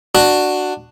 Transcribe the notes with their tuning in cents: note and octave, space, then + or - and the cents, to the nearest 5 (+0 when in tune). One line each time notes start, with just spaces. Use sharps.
D4 +10 F#4 +0